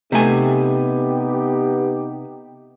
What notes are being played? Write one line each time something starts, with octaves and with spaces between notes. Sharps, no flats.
C3 A3 B3 D#4 G4 G#5